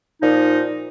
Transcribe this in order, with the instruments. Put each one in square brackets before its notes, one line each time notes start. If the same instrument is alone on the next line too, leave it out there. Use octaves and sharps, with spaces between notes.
[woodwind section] A#2 F3 D#4